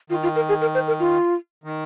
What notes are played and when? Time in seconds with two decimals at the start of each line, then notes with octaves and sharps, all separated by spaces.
0.10 D#3 F4
0.23 F4
0.36 A#4
0.49 G#4
0.61 A#4
0.74 C5
0.88 A#4
1.00 F4
1.64 D#3